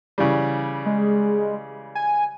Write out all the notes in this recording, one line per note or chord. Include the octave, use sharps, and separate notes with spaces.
C#3 E3 G3
G#3
G#5